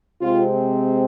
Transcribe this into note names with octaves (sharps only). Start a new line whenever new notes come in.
C3 G#3 C4 F4